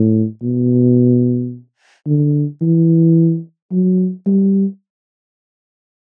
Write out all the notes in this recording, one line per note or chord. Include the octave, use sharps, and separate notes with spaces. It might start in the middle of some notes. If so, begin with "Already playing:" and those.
Already playing: A2
B2
D3
E3
F#3
G3